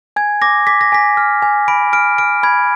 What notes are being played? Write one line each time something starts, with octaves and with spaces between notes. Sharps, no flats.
G#5 G#6
D6 A#6
D6 B6
A#6
G#5 B6
F6
G#5
B5 D7
F6 D7
F6 D7
B5 G#6